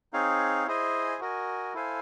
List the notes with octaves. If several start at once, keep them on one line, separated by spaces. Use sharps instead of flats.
C4 D#4 G#4 C#5 F5
E4 G#4 C5 D#5 G#5
F#4 A#4 D#5 G#5
E4 A4 C5 F5 G#5